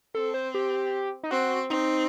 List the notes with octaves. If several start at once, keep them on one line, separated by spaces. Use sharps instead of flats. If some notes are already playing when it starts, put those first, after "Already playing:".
C4 A4
C5
G4
D#4
C4 F#4
C4 D#4